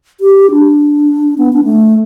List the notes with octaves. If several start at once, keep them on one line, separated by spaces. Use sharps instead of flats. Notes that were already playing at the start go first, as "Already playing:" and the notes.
G4
D4
B3
D4
A3